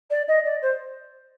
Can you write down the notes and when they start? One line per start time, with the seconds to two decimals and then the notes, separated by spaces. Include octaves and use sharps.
0.10 D5
0.28 D#5
0.44 D5
0.62 C5